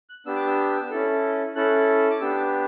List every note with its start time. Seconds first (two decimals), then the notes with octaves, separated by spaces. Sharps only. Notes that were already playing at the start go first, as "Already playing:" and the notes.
0.10 F#6
0.26 B3 D4 G4 E6
0.36 D6
0.47 E6
0.90 C#4 E4 A4
1.56 C#4 E4 A4 F#6
2.11 D6
2.21 B3 D4 G4 E6